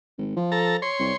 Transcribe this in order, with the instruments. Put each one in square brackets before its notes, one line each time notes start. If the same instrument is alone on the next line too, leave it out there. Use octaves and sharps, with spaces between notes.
[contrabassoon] G#1
F3
[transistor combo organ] A4 A#5
C#5 C6
[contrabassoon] C2